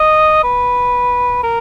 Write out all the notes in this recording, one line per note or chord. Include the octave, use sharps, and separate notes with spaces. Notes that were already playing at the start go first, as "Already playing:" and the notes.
Already playing: D#5
B4
A#4